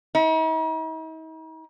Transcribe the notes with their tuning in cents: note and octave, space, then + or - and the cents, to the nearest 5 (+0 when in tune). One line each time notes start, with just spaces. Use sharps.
D#4 +45